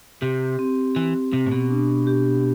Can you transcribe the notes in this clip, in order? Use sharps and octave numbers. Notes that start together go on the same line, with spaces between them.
C3 G4
C4
E3 G4
C3 G4
A2
B2
D4
G4